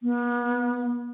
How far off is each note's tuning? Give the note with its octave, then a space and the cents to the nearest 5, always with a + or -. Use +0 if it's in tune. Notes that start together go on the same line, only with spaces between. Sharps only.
B3 -40